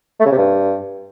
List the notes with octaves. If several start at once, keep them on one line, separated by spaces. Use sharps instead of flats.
A3
C#3
C3
G2